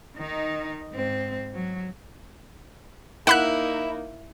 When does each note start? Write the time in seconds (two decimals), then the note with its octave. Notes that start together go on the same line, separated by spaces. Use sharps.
0.17 D#3 D#4
0.92 G#2 C4
1.55 F#3
3.27 A#3 D#4 E4 F#5 B5 F#6